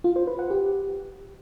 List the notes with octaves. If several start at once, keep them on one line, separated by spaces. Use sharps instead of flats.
F4
C5
B4
F#5
G4